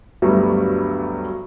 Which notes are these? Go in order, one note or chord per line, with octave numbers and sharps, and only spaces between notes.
D2 G2 F#3 G3 A3 B3